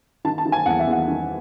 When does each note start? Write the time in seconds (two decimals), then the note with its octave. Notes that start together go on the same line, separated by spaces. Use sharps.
0.25 D#3 A5
0.38 A5
0.45 D#3
0.52 G#5
0.66 E2 F#5
0.79 E5
0.87 E2 F#5
1.08 D#3